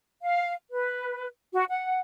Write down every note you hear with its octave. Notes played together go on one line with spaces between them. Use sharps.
F5
B4
F#4
F#5